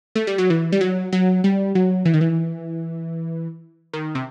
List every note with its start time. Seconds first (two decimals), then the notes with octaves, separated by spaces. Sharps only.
0.15 A3
0.27 G3
0.38 F#3
0.50 E3
0.72 G3
0.81 F#3
1.12 F#3
1.44 G3
1.75 F#3
2.05 E3
2.14 D#3
2.21 E3
3.93 D#3
4.15 C3